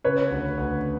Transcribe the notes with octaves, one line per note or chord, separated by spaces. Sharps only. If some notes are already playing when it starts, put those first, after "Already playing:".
C#3 B4 C#5
D2
D2